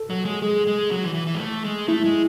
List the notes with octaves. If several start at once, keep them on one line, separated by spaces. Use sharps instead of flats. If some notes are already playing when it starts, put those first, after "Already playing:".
Already playing: A4
F#3
G#3
G#3 G#4
G#3
F#3
E3
E3
E3
G#3
A3
G#3
A3 E4
G#3